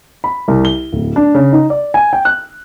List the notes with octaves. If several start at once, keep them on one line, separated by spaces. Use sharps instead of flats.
B5
C2
G7
D1
D4
C#3
D#4
D5
G#5
G5
F#6